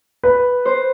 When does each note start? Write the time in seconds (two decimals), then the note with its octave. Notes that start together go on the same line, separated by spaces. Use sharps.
0.24 B4
0.65 C5